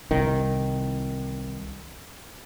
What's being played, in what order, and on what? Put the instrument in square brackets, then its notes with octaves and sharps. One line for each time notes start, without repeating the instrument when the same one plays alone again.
[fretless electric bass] C2 D#3